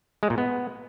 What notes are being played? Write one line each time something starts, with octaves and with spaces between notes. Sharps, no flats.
G#3
A#2
B3